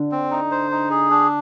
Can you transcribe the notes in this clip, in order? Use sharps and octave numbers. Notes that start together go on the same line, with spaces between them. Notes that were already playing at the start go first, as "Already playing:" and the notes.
Already playing: D3
C4
D#4
C5
D#4
G#4
D4